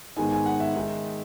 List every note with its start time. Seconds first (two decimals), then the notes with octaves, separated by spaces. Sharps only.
0.16 G#2 D#3 G#3 B3 D#4 G#5
0.31 G#5
0.46 F#5
0.60 E5
0.76 D#3 G#3 D#4